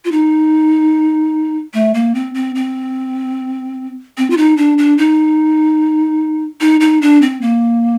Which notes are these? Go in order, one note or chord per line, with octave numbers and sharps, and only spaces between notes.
F4
D#4
A3
A#3
C4
C4
C4
C4
F4
D#4
D4
D4
D#4
D#4
D#4
D4
C4
A#3